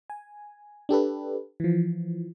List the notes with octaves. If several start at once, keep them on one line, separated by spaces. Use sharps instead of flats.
G#5
D4 G4 A4 B4
E3 F3